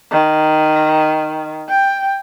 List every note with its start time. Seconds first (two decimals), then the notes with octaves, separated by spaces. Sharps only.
0.11 D#3
1.69 G5